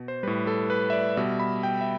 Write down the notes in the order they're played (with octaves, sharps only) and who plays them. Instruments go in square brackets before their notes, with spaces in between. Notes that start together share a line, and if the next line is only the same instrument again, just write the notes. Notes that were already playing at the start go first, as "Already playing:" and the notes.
Already playing: [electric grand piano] B2
C5
A2 G3 B4
A4
B4
E5
D5
B2 G3 E5
B5
G5
E5